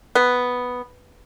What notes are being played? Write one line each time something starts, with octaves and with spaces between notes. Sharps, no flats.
B3